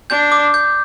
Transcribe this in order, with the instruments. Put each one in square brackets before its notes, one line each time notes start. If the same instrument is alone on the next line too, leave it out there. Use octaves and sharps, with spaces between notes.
[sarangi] D4 [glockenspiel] G6
[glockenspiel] D6
G6